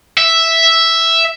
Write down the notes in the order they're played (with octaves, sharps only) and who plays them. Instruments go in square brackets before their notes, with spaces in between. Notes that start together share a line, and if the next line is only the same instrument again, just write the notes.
[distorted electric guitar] E5